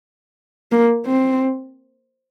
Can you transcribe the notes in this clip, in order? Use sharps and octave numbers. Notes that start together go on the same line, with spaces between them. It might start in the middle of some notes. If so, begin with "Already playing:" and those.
A#3
C4